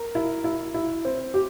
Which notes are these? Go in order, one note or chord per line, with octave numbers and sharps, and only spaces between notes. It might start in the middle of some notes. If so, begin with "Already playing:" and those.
Already playing: A#4
E4
E4
E4
C4
G4